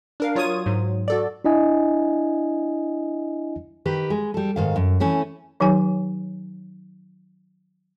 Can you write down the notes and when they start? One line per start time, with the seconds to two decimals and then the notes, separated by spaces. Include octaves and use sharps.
0.20 D4 A#4 F5
0.35 F#3 F4 C#5 D#6 G#6 D#7
0.66 G#2 F#3
1.08 F#4 A4 D5
1.45 D4 E4 D#5 G#5
3.85 D#3 G4 B4 A#5
4.10 G#3
4.34 G3 A4
4.56 G#2 D#3 F5
4.76 F#2
5.00 E3 A3 C#4
5.60 D#3 F#3 D#4 G4 C#5 G#5